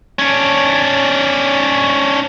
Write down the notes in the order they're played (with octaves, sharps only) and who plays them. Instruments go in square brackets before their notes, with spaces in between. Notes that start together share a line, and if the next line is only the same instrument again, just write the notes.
[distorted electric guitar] C#4 D4